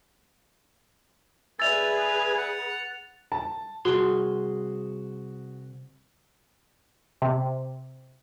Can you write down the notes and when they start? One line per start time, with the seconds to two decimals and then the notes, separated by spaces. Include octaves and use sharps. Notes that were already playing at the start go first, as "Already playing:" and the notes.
1.60 G#4 B4 D5 E5 G#5 E6 A6 F7
2.37 F#5
3.32 A5
3.85 C2 F#4 G#4 C6
7.22 C3